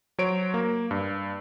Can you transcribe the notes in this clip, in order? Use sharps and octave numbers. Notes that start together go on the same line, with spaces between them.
F#3 C5 C#5 D7
A#3
G2